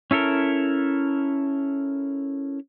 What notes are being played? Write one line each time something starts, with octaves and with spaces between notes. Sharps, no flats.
C#4 E4 A4 A#4